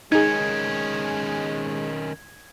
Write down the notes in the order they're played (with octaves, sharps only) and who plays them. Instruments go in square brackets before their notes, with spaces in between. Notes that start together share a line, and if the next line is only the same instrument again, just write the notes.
[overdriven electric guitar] D#3 C#4 [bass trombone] G#3 [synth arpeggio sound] D#4 G#4 [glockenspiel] G#6